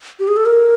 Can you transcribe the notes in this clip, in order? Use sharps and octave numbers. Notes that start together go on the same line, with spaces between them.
G4
G#4
A4
A#4